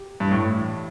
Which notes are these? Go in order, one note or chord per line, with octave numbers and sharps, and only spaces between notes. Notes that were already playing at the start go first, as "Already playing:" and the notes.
Already playing: G4
G2 E3
A2